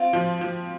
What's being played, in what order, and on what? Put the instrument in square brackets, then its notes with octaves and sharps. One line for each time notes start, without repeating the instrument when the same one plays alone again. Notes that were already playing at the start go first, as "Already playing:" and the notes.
Already playing: [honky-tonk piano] C4 [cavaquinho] F4
[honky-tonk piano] F3
F3